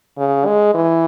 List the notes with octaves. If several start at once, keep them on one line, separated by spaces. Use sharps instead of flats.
C#3
G#3
E3